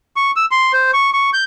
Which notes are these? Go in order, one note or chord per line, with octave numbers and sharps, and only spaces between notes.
C#6
E6
C6
C5
C#6
C#6
G6